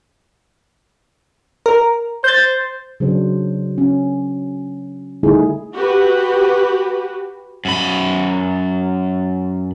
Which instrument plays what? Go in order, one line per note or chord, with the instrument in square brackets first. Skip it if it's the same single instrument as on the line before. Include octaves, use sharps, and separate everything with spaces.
[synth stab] A#4
[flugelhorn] C5 [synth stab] G6 A6
[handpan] C#3 F#3 D4 C5
C#4
D3 G3 A3 D#4 E4 G#4
[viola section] F#4 G4 B4
[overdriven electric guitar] F#2 B5